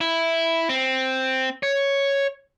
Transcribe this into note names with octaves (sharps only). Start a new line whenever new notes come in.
E4
C4
C#5